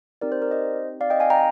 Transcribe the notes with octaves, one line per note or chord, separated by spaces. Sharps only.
C4 D#4 G4 A#4 D5
C5
A#4 D5
C5 D#5
D5 F5
D#5 G5
F5 G#5
G5 A#5